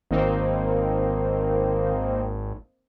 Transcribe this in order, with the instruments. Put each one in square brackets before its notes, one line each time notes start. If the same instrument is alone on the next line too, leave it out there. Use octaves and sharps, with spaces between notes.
[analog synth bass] G#1 [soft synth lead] D#3 [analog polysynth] A#3 C4 D#4